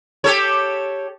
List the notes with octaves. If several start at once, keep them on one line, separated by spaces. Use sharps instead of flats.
G4 A4 C#5